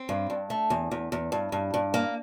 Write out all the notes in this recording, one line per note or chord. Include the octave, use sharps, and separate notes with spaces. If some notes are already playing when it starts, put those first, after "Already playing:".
Already playing: C4
G2
G2
A3
E2
E2
E2
G2
G2
G2
A#3